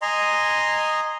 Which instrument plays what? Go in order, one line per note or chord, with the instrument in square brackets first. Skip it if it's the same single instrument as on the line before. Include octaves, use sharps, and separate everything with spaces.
[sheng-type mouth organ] D#5 G#5 A#5 C6